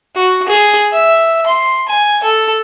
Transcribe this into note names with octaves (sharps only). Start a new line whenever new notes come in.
F#4
G#4
E5
C6
G#5
A4